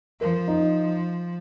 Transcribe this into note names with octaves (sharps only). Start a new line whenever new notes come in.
F3 A#4
D#4